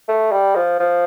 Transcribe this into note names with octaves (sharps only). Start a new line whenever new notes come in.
A3
G3
F3
F3